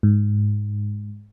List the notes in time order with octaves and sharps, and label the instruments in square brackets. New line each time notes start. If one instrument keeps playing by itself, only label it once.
[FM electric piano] G#2